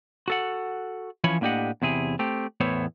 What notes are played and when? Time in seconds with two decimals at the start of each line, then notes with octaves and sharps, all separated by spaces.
0.28 F#4 A4 F#5
1.24 E3 F3 C#4 C#5 B5
1.41 A2 A#3 D4 G4 D#5 F#5
1.82 E2 C3 E4 G#4
2.19 A3 C4 G4
2.60 E2 A2 B3 E4 C5 C#5